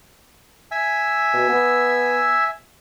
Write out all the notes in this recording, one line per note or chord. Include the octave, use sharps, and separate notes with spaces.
E5 G#5 E6
B2
B3